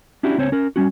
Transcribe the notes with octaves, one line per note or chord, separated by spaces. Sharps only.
C#4 D4 E4 F#4 G4
C#2 C4 C5 C#5
C#4 A#4
G3 C#4 F#4